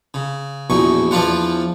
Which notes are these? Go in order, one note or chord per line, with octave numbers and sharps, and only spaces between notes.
C#3
A#1 E2 B2 C#6
E2 F3 D4 F4 F#5